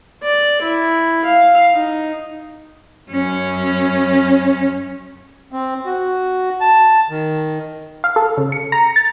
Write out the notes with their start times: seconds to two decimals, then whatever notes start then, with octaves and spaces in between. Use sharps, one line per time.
0.23 D5
0.61 E4
1.25 F5
1.73 D#4
3.11 F#2 C#4
5.52 C4
5.86 F#4
6.61 A5
7.10 D#3
8.04 F5
8.16 A4
8.37 C#3
8.52 C#7
8.72 A#5
8.96 A6